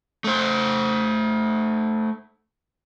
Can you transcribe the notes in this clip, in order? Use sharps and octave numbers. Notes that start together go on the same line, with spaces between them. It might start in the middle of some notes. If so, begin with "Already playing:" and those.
A3 C5